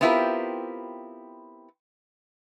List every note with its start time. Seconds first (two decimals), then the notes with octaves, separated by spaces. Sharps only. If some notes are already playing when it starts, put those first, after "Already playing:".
0.01 B3 C4 E4 F4 G4 A#4